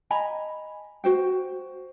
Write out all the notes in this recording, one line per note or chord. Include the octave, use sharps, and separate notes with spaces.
D#5 G#5 A#5 B5
F#4 C5 G5